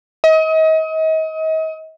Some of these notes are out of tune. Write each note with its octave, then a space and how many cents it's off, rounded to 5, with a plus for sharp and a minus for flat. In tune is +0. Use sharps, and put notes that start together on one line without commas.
D#5 +35